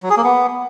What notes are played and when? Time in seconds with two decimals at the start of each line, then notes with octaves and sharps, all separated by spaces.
0.03 F#3
0.10 G#4
0.17 A#3
0.24 B3